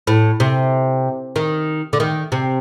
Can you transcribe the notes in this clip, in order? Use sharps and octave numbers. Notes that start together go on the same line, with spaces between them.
A2
C3
D#3
D3
D#3
C3